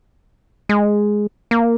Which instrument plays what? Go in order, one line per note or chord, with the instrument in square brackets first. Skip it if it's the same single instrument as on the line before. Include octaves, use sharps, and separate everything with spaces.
[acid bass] G#3
A#3